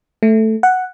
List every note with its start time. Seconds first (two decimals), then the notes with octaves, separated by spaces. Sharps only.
0.23 A3
0.63 F#5